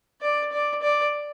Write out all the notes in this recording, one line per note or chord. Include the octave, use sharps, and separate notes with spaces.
D5
D5
D5